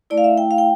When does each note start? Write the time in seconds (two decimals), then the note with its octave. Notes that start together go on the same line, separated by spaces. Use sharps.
0.10 A3 E4 D5
0.18 F5
0.24 E5
0.38 G5
0.51 F5
0.58 G5